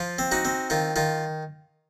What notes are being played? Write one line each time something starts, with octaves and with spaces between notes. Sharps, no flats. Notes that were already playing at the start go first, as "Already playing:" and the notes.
Already playing: F3 F4
C4
D#4 F#4
C4
D#3 F4
D#3 F4